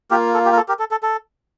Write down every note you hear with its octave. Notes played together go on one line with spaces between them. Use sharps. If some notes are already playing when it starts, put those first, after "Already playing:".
A#3 F4 G4 A#4
A4
G4
A#4
A4
G4 A#4
A4
A4
A4